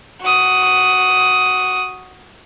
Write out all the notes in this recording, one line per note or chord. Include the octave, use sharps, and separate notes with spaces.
F#4 D#6